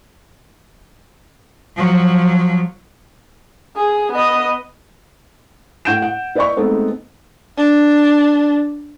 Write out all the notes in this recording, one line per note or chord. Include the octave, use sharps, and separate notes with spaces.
F3 F#3
G#4
B3 D#5
A2 F#5 G6 D7 E7
F#5
E4 B4 D5 D#5 B5 C#6
G#3 A3 B3 C4 D#4
D4